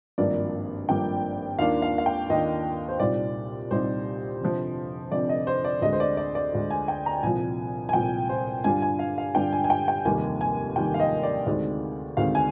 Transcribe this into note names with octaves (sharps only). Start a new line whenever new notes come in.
G#1 G2 F3 A#3 D4 D5
G#1 G2 F3 A#3 D4 G5
D#2 D#3 A#3 D4 F4 F5
F5
F5
G5
D#2 D#3 A#3 D4 F4 D#5
C5
C2 A#2 G3 C4 D#4 D5
C2 A#2 G3 C4 D#4 C5
F1 F2 D3 F3 C4
F1 F2 D3 F3 C4 D5
D#5
C5
D5
D2 D3 G#3 D#5
C5
D5
D5
D5
D2 D3 G#3
G#5
G5
A#5
C2 A#2 F3 G#5
G#5
C2 A#2 F3 G5
C5
G2 D3 G3 D4 F4 G#5
G#5
F5
F5
G2 D3 G3 D4 F4 G5
G#5
G#5
G5
G5
F1 D#2 D#3 G3 A#3 G#5
G#5
F1 D#2 D#3 G3 A#3 G5
F5
D#5
D5
D2 C3 D#3 G#3 C4 D5
D2 C3 D#3 G#3 C4 F5
G#5